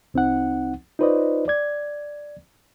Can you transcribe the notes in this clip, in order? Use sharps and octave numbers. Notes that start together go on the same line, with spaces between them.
C2 C4 D#4 F#5
D#4 F4 B4 C5 D5 D#5
D5 G#6